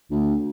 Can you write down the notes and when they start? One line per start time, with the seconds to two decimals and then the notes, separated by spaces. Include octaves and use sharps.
0.11 D2